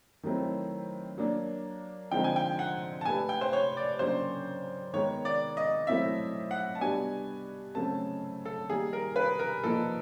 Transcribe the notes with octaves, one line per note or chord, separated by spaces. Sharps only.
D#3 F#3 A3 C4 E4
F#3 A#3 D4
D3 F3 G#3 C4 D#4 G5
G#5
G5
F#5
A5
A3 D4 G4 B4 G#5
G5
C5
C#5
D5
C#3 F#3 A#3 D4 C5
D#3 G#3 B3 C#5
D5
D#5
F#3 A3 C4 E4 E5
F#5
A5
G3 B3 D4 F#4 G#5
C#3 F#3 A3 C4 A5
A4
D#3 G3 A#3 G#4
A#4
B4
A#4
A#2 F3 A#3 D#4 A4